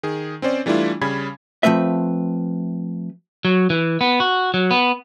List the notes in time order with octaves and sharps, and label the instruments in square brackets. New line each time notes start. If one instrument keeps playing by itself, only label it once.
[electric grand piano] D#3 G#4
C4 C#4 C5 D5
E3 G3 A3 D4 E4 F4
C#3 G3 C#4 B5 G#6
[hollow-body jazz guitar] F3 A3 C4 B4 E5
[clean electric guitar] F#3
E3
B3
F#4
F#3
B3